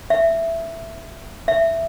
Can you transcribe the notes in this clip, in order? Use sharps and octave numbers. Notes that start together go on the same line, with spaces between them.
E5
E5